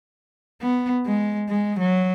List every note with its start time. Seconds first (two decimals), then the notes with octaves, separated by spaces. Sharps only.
0.62 B3
1.06 G#3
1.49 G#3
1.80 F#3